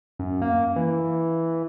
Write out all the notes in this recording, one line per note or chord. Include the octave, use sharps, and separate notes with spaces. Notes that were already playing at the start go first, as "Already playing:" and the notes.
F#2
A#3
E3